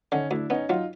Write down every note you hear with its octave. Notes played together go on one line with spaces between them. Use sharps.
D3 C#4 D#4
D2 D4 E4
B3 C#4 D#4
F#3 D#4 F4